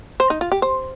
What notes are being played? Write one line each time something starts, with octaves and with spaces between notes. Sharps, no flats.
C5
D#4
F4
G4
C5